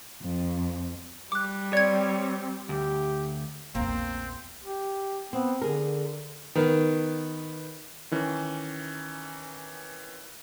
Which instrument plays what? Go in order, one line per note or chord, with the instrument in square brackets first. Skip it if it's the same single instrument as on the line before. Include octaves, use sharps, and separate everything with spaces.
[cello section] F2
[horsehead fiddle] G3 [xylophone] D6 F#6
[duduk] C4 [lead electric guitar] C#5 [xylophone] D5 G#6
[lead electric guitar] D2 [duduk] G4
[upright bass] A#1 E2 [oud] A#3 [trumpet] C4
[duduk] G4
[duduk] B3 [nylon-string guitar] C4
[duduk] D3 [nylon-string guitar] G#4 A#4
[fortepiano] D#3 B3
[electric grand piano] D#3 E3 C#4